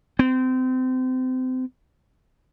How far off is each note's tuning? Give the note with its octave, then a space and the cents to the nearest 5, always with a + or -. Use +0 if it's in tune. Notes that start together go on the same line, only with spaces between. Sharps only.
C4 -30